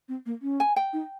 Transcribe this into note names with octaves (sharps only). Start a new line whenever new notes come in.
C4
A#3
C#4
G#5
G5
D#4